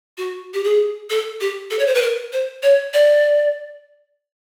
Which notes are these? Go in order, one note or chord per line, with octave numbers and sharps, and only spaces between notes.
F#4
G4
G#4
A4
G4
A4
C#5
C5
B4
A#4
C5
C#5
D5